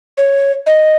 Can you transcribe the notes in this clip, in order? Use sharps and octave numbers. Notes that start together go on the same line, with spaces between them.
C#5
D#5